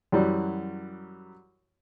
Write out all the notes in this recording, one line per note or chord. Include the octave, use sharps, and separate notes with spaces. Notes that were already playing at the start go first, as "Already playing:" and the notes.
F#2 E3 F#3 G3